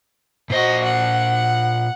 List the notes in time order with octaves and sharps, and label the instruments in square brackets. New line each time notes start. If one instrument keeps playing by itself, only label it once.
[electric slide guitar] A#2 C5 [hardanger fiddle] F#4 D#5
[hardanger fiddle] F#5